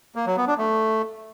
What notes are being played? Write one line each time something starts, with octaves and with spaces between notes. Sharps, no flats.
A#3
F#3
B3
D4
A3